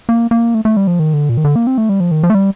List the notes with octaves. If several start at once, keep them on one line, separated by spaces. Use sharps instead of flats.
A#3
A#3
A3
A3
G3
F3
D#3
D3
A#2
D#3
D3
A#3
C4
A3
G3
F3
D#3
F3
A3
G3